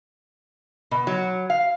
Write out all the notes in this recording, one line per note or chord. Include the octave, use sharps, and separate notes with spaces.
B2
F#3
F5